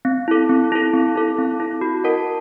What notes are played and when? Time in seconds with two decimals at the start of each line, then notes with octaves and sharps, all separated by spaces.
0.05 C4
0.28 E4 A4
0.49 C4
0.72 E4 A4
0.94 C4
1.16 E4 A4
1.38 C4
1.60 E4 A4
1.81 F#4
2.04 A#4 D#5 F#5 A5